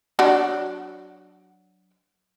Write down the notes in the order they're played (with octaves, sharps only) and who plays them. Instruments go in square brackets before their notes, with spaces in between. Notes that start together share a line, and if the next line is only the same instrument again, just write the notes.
[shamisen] F#3 D4 F#4